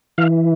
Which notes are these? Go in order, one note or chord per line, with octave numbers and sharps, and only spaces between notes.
E3 F5